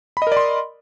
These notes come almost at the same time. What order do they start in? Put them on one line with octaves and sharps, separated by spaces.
B5 D#5 A#4 D5 C6